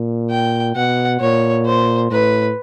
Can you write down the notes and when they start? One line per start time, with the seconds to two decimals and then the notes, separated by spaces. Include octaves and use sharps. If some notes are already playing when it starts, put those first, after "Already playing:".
Already playing: A#2
0.30 G5
0.75 B2 F#5
1.20 A#2 C#5
1.66 C5
2.11 A2 B4